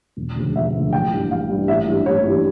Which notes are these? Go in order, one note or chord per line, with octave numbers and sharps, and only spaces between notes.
E1
D2 C#3 F3
E1 E5
D2 C#3 F3
A1 G5
G2 E3 G3
A1 F5
G2 E3 G3
A1 E5
G2 E3 G3
A1 C#5
G2 E3 G3